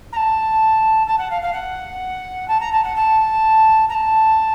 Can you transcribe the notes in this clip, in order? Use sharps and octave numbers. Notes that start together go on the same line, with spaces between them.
A#5
A5
A5
F#5
F5
F5
F#5
A5
A#5
A5
F#5
A5
A#5
A5